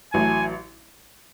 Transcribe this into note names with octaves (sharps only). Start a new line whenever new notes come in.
A1 A2 F#3 A3 G#5